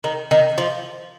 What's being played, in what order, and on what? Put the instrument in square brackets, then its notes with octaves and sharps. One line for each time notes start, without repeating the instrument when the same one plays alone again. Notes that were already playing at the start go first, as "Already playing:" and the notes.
[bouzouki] D#3
D#3
F3